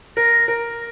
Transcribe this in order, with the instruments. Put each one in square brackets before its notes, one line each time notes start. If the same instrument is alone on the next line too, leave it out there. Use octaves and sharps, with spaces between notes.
[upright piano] A#4 [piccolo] A#6
[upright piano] A#4